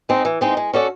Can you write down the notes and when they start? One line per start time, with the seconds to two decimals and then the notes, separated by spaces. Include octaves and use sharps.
0.09 G#3 C4 D#4
0.25 E3
0.41 G#3 C4 D#4
0.57 G#3
0.73 C#4 F#4 A4 D5